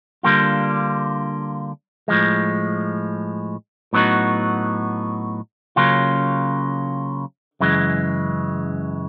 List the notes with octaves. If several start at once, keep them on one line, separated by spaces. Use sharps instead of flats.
D3 G3 A#3 D4 F4
A2 F3 G#3
A2 F#3 B3 D#4 F#4
C#3 F#3 A#3 C#4 F4
F#2 C#3 E3 G#3